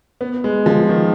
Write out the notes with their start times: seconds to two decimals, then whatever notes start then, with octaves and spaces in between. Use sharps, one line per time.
0.21 B3
0.44 G#3
0.66 F3
0.89 D#3